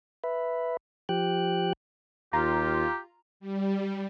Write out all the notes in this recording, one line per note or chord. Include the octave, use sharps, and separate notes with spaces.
B4 E5
F3 G4 G5 F#6
D#2 F4 G4 A#5
G3